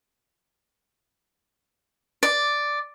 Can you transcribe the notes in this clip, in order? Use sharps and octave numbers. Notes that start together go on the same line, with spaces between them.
D5